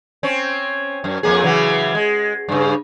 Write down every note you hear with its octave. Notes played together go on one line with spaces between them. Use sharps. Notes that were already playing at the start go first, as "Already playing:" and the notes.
C4 C#4
F#2
F2 A#3 G#4
C#3 E3 F#3
G#3
G2 C#3